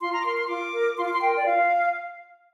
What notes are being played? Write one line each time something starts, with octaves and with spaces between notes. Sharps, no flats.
F4 C6
A#5
D6
A#4 C6
C6
F4 D6
A#4
F4 C6
D6
C6
A#4 G5
D5
F4 F5